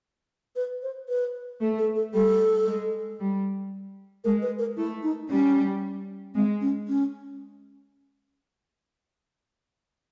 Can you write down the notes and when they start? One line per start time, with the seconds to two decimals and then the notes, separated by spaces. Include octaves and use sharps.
0.56 B4
0.83 C5
1.09 B4
1.61 A3 A4
1.78 A4
1.96 A4
2.14 G3 A4
2.67 G#3
3.20 G3
4.24 G#3 A#4
4.42 B4
4.59 A#4
4.77 A3 E4
5.03 D#4
5.29 G3 C#4
6.34 G#3 C4
6.61 C#4
6.88 C#4